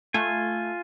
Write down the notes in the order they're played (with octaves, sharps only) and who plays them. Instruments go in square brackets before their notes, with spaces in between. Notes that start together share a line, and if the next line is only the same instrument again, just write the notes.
[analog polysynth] A3 [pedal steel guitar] F4 G#5